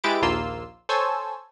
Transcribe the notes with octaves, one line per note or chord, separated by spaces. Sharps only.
G#3 E4 G4 B4 A6 D7
A#1 D#2 A#3 F4 C6 E6
A4 C5 C#5 G#5 E6